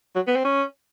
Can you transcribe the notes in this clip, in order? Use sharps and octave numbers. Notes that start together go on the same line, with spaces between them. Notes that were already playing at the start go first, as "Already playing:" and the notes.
F#3
B3
C4
C#4